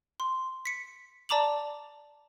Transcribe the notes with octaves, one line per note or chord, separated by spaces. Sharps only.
C6
B6 C#7
D5 A5 A#5 D6 F7 F#7